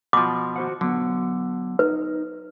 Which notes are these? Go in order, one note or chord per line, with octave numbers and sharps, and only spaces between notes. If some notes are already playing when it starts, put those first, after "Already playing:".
B2 F3 D6
F#4 C5 F#5
D3 F#3 B3
D#4 B4